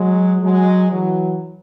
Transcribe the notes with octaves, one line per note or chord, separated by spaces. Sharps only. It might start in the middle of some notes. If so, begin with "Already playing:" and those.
Already playing: F#3 G#3
F#3 G#3
E3 F#3